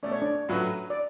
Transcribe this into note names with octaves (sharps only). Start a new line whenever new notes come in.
B2 A3 C#4 D5
C#5
D4 D5
A2 F#3 C#4 F#4 B4
D5